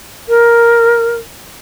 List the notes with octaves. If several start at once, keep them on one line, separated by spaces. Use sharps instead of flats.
A#4